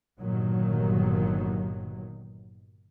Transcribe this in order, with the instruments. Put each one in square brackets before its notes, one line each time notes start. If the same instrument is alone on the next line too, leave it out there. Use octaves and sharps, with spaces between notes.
[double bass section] G1 G2 A#2 D#3 F#3